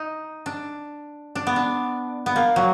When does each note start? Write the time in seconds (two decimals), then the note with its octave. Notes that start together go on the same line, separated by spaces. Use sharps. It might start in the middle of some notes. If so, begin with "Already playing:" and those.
Already playing: D#4
0.46 D4
1.35 D4
1.47 B3
1.56 D4
2.26 B3
2.36 A#3
2.56 F#3